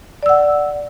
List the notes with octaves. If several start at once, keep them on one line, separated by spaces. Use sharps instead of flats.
D5 F#5 E6